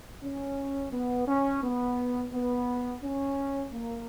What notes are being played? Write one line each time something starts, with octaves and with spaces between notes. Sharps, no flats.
C#4
B3
C#4
B3
B3
C#4
A#3